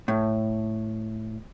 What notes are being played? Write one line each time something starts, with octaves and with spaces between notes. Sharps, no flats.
A2